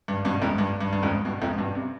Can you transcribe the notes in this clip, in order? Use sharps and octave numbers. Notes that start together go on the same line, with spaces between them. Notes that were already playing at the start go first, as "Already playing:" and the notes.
G2
G2 B2
F2 G#2
G2
G2
G2
F2 G#2
G2 B2
F2 G#2
G2 B2
C3